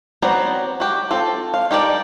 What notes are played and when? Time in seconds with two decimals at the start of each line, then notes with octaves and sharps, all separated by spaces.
0.22 F#3 B3 C4 D5 A#5
0.80 F#4 G4
1.11 C4 F4 A4
1.54 F5
1.71 D#4 G4 A#4 D5 A5